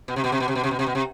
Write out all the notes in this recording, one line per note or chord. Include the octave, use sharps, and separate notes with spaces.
B2
C3
B2
C3
B2
C3
B2
C3
B2
C3
B2
C3